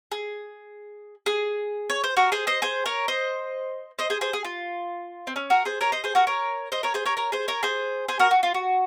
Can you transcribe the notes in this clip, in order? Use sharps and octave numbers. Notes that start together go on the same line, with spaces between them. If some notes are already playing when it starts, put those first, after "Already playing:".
G#4
G#4
C#5
C5
F#4 A#4
G#4 C5
C5 D#5
G#4 C5
A#4 C#5
C5 D#5
C5 D#5
G#4 C5
G#4 C5
G#4
F4
C4
C#4
F#4 A#4
G#4 C5
A#4 C#5
C5 D#5
G#4 C5
F#4 A#4
A#4 C#5
C5 D#5
A#4 C#5
G#4 C5
A#4 C#5
A#4 C#5
G#4 C5
A#4 C#5
G#4 C5
G#4 C5
F#4 A#4
F#4
F4
F#4